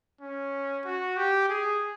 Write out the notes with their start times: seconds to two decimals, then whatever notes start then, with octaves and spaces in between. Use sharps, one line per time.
0.21 C#4
0.85 F#4
1.17 G4
1.49 G#4